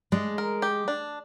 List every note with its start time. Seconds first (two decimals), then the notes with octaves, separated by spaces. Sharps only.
0.12 G#3 D4
0.38 A#4
0.62 G4
0.88 D4